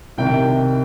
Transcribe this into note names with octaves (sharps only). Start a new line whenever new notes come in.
C2 C3 D#3 G5